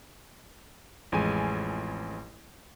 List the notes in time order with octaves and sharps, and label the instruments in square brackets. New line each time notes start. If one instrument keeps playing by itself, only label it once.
[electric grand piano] A1 F2 G#3 G#5 D#7